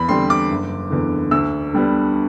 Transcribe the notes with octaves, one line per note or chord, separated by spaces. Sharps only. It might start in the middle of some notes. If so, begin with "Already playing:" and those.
Already playing: E2 B5
D3 G3 C4 C6
D6
F#1
E2 D3
D2 E6
D3 G3 B3